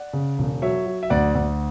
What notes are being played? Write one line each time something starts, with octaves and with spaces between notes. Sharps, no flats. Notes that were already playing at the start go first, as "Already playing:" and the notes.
Already playing: D5 F#5
C#3
E1
F#3 C#5 E5
F#3
E5
D2 D5 F#5
D2